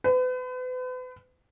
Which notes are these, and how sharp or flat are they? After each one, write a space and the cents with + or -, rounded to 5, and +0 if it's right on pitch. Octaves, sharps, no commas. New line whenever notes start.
B4 +40